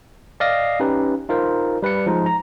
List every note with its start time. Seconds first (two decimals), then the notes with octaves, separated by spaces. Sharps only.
0.40 D5 D#5 F5 D#6 A#6 C7
0.80 C#4 D#4 G4 B4
1.29 D#4 F4 A#4 C5
1.83 G3 B4 D5 C#7
2.07 F3 G#3 D#4
2.26 A#5